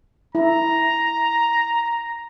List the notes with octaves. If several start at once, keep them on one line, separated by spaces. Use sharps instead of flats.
E4 A#5